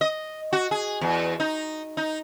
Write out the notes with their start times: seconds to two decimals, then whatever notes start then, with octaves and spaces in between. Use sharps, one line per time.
0.01 D#5
0.53 F#4
0.71 G#4
1.01 E2
1.40 D#4
1.97 D#4